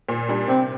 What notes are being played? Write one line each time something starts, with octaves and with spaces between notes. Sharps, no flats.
A#2
G3 D4
C3 C4